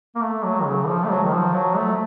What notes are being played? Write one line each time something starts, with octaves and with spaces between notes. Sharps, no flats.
A#3
A3
F#3
D#3
C#3
F3
A3
F#3
D#3
F3
F#3
A3